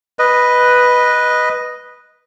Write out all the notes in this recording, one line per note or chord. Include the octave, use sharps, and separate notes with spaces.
B4 D#5